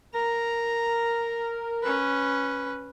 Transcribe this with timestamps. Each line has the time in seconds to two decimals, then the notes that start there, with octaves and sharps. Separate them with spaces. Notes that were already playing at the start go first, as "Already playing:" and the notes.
0.14 A#4 A#5
1.83 C#4 B4